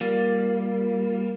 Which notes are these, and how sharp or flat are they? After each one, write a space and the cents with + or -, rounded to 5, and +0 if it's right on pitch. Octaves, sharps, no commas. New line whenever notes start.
G3 +0 A#3 +0 F4 +20